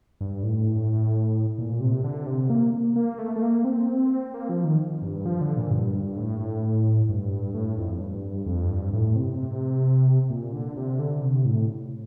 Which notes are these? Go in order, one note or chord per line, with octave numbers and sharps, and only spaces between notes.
G2
A2
A#2
C3
D3
C3
A#3
A#3
A3
A3
A#3
C4
A#3
F3
D#3
G2
F3
D3
A#2
G2
G2
A2
A2
G2
A2
F2
G2
F2
G2
A2
C3
A#2
D3
C3
D3
C3
A2